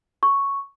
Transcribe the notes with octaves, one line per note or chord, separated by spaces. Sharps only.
C#6